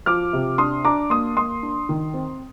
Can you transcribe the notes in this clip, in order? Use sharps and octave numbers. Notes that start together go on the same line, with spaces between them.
F3 D6 F6
C3
D4 C6 D#6
D4 A#5 D6
A#3 C6 D#6
A#3 C6 D#6
D4
D#3
C4